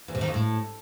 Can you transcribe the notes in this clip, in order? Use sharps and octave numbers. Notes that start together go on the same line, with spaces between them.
E2
C3
D#3
F2
A2